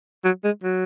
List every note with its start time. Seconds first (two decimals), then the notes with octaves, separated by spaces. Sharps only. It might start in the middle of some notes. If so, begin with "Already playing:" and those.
0.25 F#3
0.44 G#3
0.64 F#3